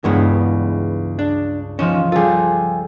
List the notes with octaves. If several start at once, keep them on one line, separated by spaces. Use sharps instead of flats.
C#2 G2 E3 G#3 B3
D4
F3 C#4 D#4 E7
G3 F4 G#4 A4